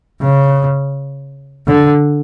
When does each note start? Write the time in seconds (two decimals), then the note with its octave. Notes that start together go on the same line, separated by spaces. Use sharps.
0.21 C#3
1.67 D3